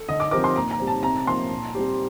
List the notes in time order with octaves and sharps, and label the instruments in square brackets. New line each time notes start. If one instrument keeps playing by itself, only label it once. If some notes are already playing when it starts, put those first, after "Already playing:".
Already playing: [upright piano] A4
[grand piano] D3 [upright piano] D#5
[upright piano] D6
[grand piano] F3 C4 G4 A#4 [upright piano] D6
[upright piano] C6
[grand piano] A#2 [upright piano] A#5
[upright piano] A#5
[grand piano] G3 C4
[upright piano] A5
[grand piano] C3 [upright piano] A#5
[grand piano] F3 A#3 [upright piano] C6
[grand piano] A#2
G3 C4 G4